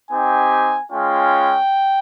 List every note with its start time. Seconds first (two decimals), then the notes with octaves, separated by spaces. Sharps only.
0.11 C4 D#4 G4 G#5
0.92 G#3 C#4 F4 G5